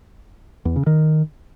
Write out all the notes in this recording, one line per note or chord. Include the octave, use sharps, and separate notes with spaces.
E2
C#3
D#3